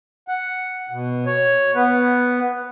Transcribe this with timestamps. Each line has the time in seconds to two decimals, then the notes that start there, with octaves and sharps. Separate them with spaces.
0.28 F#5
0.91 B2
1.26 C#5
1.75 B3 B4